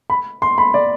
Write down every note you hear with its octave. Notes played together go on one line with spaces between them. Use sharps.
B5
C6
B5
D5